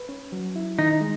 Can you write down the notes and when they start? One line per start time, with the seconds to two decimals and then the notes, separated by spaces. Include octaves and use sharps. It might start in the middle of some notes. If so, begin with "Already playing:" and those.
Already playing: B4
0.09 C#4
0.32 F#3
0.56 E4
0.79 D#3 D#4
1.01 G#3